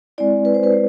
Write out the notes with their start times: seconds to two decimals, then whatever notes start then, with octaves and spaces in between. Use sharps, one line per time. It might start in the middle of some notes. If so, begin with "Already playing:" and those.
0.18 G#3 C4 E4 D5
0.45 B4
0.54 C5
0.63 B4
0.72 G#3